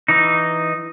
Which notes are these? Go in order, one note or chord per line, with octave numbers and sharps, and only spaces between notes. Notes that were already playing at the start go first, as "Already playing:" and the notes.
E3 D#4